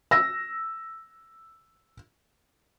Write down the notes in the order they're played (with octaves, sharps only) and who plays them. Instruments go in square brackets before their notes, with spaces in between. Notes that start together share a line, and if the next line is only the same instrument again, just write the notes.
[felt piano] E6 A#6